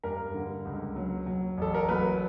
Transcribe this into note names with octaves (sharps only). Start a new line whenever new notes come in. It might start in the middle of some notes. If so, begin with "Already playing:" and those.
G2 A#4
D3
C#2
F#3
F#3
A1 A4
A#4
F#3 B4